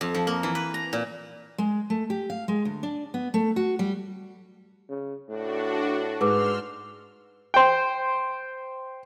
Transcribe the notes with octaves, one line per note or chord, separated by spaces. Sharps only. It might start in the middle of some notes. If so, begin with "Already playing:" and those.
F2
F3
A#3
E3
B4
A#5
A#2
G#3
A3
G4
F5
G#3
D2
D4
B3
A3
F#4
G3
C#3
A2 D4 F#4
G#2 G#4 B4 C6 D6 E6 F6
C5 G5